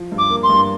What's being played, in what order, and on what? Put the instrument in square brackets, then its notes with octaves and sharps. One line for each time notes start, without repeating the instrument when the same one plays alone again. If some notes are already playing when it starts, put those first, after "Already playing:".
Already playing: [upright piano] F3
G2
[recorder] D6
[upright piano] A#3
[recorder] C6
[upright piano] G2